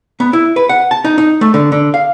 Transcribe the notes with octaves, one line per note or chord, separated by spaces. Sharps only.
B3
E4
B4
F#5
A5
D#4
D#4
A3
D3
D3
F5